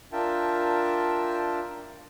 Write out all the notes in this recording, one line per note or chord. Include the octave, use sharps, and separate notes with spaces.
D4 F4 A#4 E5 G5 A5